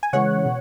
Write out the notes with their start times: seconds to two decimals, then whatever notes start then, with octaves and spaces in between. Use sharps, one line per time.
0.03 G#5
0.13 C#3 E3 G#3 C#5 F#5
0.45 B2